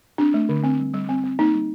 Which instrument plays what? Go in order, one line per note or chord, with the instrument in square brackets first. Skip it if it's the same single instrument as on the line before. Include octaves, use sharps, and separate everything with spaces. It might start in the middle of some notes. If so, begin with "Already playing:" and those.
[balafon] C4 D4
A3
D3
C4
G3
G3
C4
C4
A#3 D#4
G3